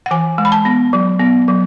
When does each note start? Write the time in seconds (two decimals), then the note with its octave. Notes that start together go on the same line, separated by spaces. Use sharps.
0.06 F#5
0.11 E3 G#5
0.38 G#3
0.45 B5
0.52 A5
0.65 B3
0.93 F#3
1.20 B3
1.48 F#3